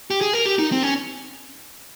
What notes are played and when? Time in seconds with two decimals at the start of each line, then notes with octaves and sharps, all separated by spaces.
0.10 G4
0.21 G#4
0.33 A#4
0.46 G4
0.59 D#4
0.72 C4
0.83 C#4